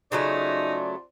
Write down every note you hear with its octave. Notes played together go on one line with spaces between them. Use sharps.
C#3 F#3 A3 D#4 F4 C5 D5